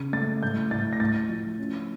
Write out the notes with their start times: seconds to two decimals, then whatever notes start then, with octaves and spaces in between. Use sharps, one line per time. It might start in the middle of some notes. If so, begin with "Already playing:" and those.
Already playing: C#3
0.13 A3 A6
0.43 A2 G6
0.71 A2 A6
0.93 A#6
1.00 A2 A6
1.29 F3
1.59 C#4